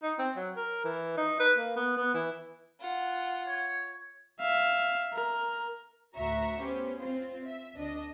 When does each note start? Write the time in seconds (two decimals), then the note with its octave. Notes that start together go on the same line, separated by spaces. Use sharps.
0.03 D#4
0.19 C4
0.36 F#3
0.56 A#4
0.85 E3
1.17 D#4
1.40 B4
1.58 A#3
1.76 B3
1.97 B3
2.14 E3
2.80 F4 F#5
3.47 C#5
4.40 E5 F5
5.13 A#4
6.16 D2 A2 F#4 E5 A#5 C#6
6.60 B3 C#4 G4 C5
6.99 C4 F4 C5
7.46 E5
7.76 D2 D4 D#5